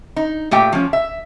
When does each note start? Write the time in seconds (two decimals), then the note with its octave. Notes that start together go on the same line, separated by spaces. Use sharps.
0.16 D#4
0.51 A#2 A3 G4 G5
0.72 F3 C#4
0.93 E5